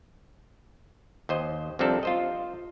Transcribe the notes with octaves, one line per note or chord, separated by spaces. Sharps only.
D#2 C5 D#5
C2 C3 F3 C4 D4 A4
F4 C5 D#5